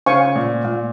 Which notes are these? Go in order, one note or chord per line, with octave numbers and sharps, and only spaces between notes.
C#3 C5 F5 G#5 C#6
A#2
A#2